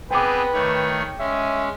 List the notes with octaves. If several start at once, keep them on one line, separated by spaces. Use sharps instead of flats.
B3 C4 G#4 B4 G5 D6
D#3 A3 C#5
G#3 C#4 E5